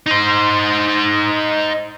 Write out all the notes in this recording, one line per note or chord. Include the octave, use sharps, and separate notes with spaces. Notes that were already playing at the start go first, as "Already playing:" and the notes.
D#4 C5